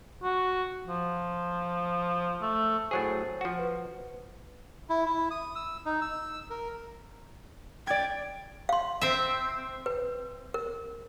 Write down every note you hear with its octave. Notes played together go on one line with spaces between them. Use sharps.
F#4
F3
A3
A2 F#3 G#4 C5 C#6 A6
F3 F#4
B4
E4
E4
D#6
E6
D#4
E6
A#4
D5 G5 G#6
F5 C6
C4 E5
B4
A#4